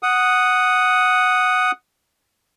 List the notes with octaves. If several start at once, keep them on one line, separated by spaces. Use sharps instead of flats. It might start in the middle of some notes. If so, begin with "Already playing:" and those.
F#5 D#6